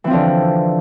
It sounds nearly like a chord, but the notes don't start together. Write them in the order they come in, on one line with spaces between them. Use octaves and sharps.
E3 C4 F3 D3